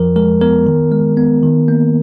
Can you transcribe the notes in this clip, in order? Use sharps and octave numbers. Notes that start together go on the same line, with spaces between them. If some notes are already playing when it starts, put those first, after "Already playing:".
Already playing: F2 F3 A#4
G#3 A#4
B3 A#4
D#3
G#3
B3
D#3
A#3